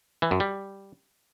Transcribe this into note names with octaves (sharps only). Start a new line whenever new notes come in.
E3
F#2
G3